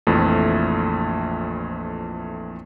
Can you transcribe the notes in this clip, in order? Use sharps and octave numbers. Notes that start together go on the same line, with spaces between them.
A#1 F2 E3 A3